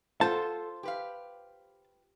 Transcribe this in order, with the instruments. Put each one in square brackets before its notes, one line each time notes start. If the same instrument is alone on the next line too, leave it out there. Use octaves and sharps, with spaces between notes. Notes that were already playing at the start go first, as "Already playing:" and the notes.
[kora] F4 C5 [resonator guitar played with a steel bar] A4 F#5 [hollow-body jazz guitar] A5
[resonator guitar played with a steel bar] G4 B4 F5